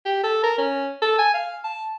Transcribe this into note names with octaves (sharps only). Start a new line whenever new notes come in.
G4
A4
A#4
C#4
A4
G#5
F5
A5